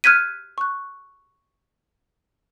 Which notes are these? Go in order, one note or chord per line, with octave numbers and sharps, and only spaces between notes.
F6 F#6 G#6 B6 D#7
C#6 F#6